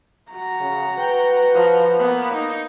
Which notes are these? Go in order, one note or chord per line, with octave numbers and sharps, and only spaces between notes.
F#4 A#5
C#3
B4 G5
F3
A#3 B3
D#4